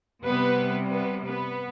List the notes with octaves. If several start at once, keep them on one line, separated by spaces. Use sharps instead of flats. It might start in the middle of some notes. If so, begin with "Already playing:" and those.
C3 G3 B3 B4
B3 B4
B3 B4